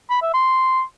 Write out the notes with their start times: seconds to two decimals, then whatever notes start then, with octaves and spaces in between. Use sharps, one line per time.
0.10 B5
0.22 E5
0.34 C6